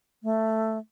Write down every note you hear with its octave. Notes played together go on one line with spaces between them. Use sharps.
A3